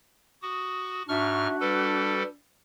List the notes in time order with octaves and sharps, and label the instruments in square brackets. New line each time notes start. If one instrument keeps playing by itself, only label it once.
[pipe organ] F#4 [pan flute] D#6
[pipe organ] G#2 C#6 F6 [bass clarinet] D4 [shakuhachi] F#4 [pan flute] E5
[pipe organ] G3 A4 [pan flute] B4